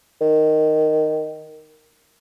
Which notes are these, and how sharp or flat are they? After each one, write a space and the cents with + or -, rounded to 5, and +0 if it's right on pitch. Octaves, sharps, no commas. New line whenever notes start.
D#3 -5